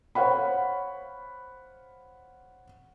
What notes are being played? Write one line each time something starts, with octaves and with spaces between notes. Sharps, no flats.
C5 C#5 F5 F#5 B5